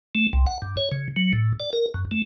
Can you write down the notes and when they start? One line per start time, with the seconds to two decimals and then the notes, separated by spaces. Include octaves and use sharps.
0.15 A3
0.33 C2
0.47 F#5
0.62 G2
0.77 C#5
0.92 C#3
1.16 F#3
1.33 A2
1.60 D5
1.73 A#4
1.94 F#2
2.11 A3